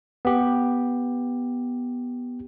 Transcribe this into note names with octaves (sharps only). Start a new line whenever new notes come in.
B3 G4